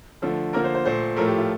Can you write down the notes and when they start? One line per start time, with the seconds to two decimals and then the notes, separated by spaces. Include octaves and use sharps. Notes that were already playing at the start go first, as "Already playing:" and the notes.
0.22 D3 F3 A3
0.53 D3 F3 A#3 A#4
0.64 C5
0.75 C5
0.85 A#2 A3 C5
1.16 A2 F3 A3 A#4
1.28 G4
1.39 F4